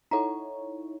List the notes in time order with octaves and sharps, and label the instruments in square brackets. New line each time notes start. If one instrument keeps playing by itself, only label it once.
[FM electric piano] D#4 E4 C#5 [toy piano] A4 F#5 A#5